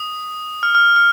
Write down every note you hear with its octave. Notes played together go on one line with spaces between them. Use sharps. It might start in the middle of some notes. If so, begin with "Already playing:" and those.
Already playing: D#6
F6
F6
F6